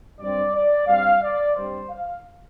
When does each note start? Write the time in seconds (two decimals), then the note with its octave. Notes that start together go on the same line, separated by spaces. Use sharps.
0.20 G2 G3 C4 D5
0.54 D5
0.87 G2 G3 C4 F5
1.22 D5
1.55 G2 G3 C4 C5
1.90 F5